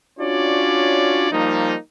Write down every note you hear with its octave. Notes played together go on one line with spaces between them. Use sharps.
C#4 D4 F4 F#4 C#5 D5
F3 G3 A#3 D#4